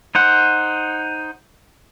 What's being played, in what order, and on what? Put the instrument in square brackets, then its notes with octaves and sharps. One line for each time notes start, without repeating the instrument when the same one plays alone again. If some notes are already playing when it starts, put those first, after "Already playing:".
[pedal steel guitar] D#4 C5 F#5